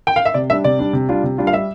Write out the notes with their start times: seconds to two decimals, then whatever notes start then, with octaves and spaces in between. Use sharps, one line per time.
0.07 G5
0.16 F5
0.25 E5
0.34 C3 D5
0.50 G3 D4 E5
0.64 C3 D5
0.79 G3 D4
0.93 C3
1.09 G3 D4 F4
1.23 C3
1.38 G3 D4 F4
1.47 F5
1.53 G3 E5